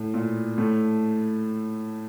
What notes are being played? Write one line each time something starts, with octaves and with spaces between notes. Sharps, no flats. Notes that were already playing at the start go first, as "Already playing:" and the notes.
Already playing: A2
A#2
A2 A3